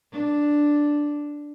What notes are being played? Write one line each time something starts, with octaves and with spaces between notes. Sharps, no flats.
D4